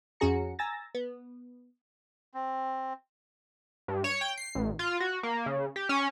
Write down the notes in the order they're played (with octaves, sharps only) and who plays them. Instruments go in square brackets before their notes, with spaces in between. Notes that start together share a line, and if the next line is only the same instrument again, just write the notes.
[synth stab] F2 C#4 F#4 G#4 A#5 C#7
G#5 A#5 E6 A6 A#6
B3
[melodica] C4
[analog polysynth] G2
C#5
G5
C7
A1
F4
F#4
A#3
C#3
G4
C#4